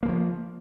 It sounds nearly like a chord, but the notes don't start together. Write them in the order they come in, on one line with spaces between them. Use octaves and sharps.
A#3 E3 F3